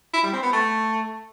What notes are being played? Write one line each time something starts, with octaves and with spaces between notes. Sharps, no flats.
E4
G3
C4
B3
A3